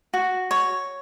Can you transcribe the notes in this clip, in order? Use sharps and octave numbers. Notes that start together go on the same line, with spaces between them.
F#4
C#5